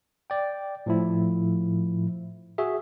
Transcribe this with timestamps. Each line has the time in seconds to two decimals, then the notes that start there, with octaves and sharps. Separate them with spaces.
0.30 D5 G5
0.86 A2 F3 E4
2.58 F#4 G#4 E5